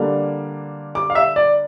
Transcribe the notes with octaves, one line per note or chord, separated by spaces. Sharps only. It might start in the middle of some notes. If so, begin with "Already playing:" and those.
Already playing: D3 G3 A#3 D4
D6
F5
E5
D5